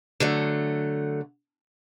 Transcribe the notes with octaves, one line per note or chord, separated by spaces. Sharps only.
D3 F#3 A3